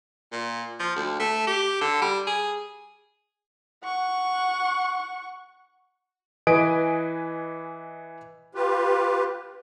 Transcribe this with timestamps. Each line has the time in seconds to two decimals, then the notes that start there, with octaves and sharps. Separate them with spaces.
0.32 A#2
0.80 F3
0.96 D2
1.19 A3
1.47 G4
1.81 D3
2.01 G3
2.27 G#4
3.84 F#5 C#6
6.47 E3 B4 D#5 G#5 D#6 D7
8.55 F4 G4 B4